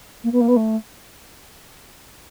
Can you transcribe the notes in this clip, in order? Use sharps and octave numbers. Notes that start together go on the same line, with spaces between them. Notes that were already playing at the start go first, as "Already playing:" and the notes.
A#3
B3
A#3
B3
A3